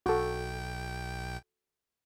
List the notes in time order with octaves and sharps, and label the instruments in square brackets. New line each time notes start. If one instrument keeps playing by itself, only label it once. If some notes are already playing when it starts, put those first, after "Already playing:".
[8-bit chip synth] B1 G5 [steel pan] F#4 A4